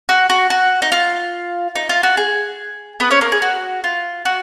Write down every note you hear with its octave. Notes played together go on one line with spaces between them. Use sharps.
F#4
F#4
F#4
D#4
F4
D#4
F4
F#4
G#4
B3 B4
C#4 C#5
A#3 A#4
G#4
F#4
F4
F#4